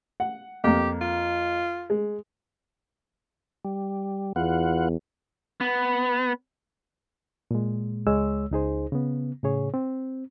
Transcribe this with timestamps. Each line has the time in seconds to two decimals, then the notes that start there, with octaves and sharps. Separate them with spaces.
0.20 F#5
0.64 F2 A#3 G4
1.01 F4
1.90 G#3
3.65 G3
4.36 E2 B3 F4 F#5
5.61 B3
7.51 A#2 G#3
8.07 C#2 G#3 C#5 E6
8.52 C#2 D#4 G#4 C5
8.92 C#3 B3
9.43 A2 C#3 G#4 C#5
9.74 C4